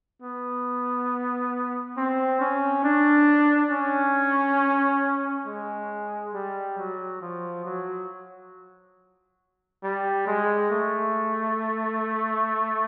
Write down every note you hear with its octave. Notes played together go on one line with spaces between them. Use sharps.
B3
C4
C#4
D4
C#4
G#3
G3
F#3
F3
F#3
G3
G#3
A3